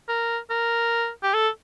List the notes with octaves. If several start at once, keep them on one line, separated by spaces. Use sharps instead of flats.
A#4
A#4
G4
A4